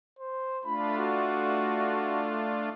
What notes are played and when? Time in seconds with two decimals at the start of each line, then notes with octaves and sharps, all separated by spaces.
0.19 C5
0.64 A3 D4 F4 B5
0.98 F#4